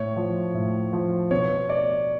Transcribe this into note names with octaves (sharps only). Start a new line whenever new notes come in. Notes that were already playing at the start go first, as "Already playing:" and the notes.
Already playing: A2 C#5
F3
A2
F3
B2 C#5
D5